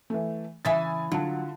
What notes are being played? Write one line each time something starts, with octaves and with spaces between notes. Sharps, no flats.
E3 A3
C#3 E3 E5 G#5 D#6 A6
D3 F#3 F4 A5